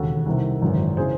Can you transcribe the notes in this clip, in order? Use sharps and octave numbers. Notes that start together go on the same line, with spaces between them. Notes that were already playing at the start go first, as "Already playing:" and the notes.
Already playing: E1 D#2 C#3 F#4 A4
C2 C3 D#3
G#1 F#2 C#3 E3
C#3 E3 G#4 C5